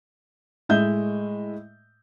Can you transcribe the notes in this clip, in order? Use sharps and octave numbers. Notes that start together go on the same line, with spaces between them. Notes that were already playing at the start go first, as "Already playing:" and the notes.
A2 G#3 D#5 E5 G6